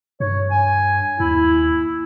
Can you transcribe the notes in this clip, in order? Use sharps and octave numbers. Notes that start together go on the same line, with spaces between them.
G2 C#5
G#5
D#2 E4